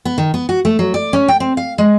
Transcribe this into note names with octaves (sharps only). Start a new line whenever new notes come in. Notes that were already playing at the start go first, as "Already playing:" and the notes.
B3
D#3
B3
F#4
A3
F#3
D5
C#4
G5
C4
F5
G#3